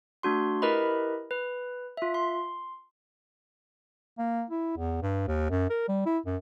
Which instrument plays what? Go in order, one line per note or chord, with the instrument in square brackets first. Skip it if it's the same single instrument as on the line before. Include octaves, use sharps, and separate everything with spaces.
[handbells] A3 D4 F#4 C6
E4 G4 A#4 B4 D#5 B5
B4
F4 E5
C6
[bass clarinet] A#3
E4
E2
G2
D#2
F#2
A#4
G3
E4
F#2